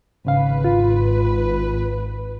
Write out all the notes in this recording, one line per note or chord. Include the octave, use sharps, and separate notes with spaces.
G#1 G#2 C#3 B4 F5
F4